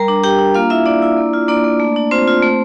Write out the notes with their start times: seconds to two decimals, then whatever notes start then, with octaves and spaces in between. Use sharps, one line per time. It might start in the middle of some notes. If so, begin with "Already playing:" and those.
Already playing: G3 A#4 A#5
0.08 D4
0.24 D4 G4 G5
0.39 D4
0.55 A#3 F4 F5
0.70 A#3 E4 E5
0.86 A#3 D4 D5
1.02 E4
1.17 A#3
1.33 F4
1.48 A#3 D4 D5
1.64 A#3
1.80 A3
1.96 D4
2.11 C4 F4 C5
2.27 F4
2.43 A3